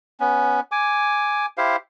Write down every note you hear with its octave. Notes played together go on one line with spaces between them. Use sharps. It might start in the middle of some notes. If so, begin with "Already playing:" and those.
B3 C#4
G#5 D6
E4 G4 C5 F5